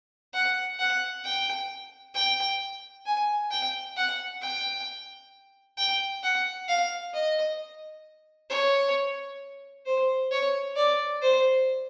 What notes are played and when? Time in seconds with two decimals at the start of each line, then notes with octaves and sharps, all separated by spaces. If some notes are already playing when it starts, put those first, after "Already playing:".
0.33 F#5
0.79 F#5
1.24 G5
2.15 G5
3.06 G#5
3.51 G5
3.96 F#5
4.42 G5
5.77 G5
6.23 F#5
6.68 F5
7.13 D#5
8.50 C#5
9.85 C5
10.31 C#5
10.76 D5
11.22 C5